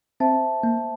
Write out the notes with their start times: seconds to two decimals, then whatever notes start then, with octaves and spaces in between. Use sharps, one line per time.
0.20 C4 C5 E5 A5
0.63 A#3